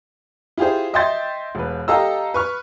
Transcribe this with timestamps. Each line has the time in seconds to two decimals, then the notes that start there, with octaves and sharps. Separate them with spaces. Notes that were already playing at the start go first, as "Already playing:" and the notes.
0.58 E4 F4 G4 G#4 C5
0.93 D#5 E5 G5 C6 G6 A6
1.55 E1 B4
1.88 G4 A4 D#5 F5 A#5 E6
2.34 B4 C#6 F6